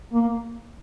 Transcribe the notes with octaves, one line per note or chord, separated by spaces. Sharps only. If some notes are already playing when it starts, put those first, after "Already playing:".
A#3